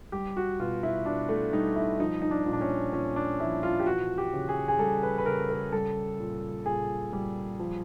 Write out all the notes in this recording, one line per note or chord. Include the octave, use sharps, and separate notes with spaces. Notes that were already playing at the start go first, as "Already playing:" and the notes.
G3 G4
F#4
B2 F4
E4
B2 D4
A3
G3 D#4
E4
F3 D#4
D#4
D4
A#2 D#4
D4
C#4
A#2 C#4
D4
F3 E4
F4
G4
E3 F#4
G4
C#3
G#4
G#4
G3 A4
B4
B4
C#3 A#4
A#4
G3 A4
A#2
A#2 G#4
G3
F3